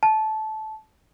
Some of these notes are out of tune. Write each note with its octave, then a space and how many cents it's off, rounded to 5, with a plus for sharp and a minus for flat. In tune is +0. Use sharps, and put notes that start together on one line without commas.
A5 -15